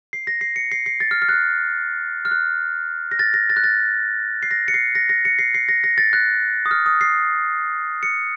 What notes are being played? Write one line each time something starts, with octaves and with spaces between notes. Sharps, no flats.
C7
A#6
C7
C#7
C7
C7
A6
F6
F6
F#6
F6
F6
F#6
A#6
A6
A#6
A6
F#6
A6
C7
A#6
C#7
C7
A#6
A#6
C#7
C7
C7
A#6
A#6
A6
F#6
D#6
F6
D#6
C7
C#7